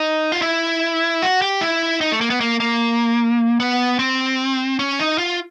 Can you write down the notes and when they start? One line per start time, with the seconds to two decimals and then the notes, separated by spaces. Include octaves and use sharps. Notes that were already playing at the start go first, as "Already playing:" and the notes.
Already playing: D#4
0.32 F4
0.42 E4
1.22 F#4
1.42 G4
1.61 E4
2.01 D#4
2.12 A3
2.21 A#3
2.30 B3
2.41 A#3
2.60 A#3
3.60 B3
3.99 C4
4.79 C#4
4.99 D#4
5.18 F4